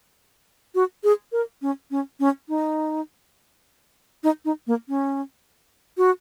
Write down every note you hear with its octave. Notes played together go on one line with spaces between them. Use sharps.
F#4
G#4
A#4
C#4
C#4
C#4
D#4
D#4
D#4
A#3
C#4
F#4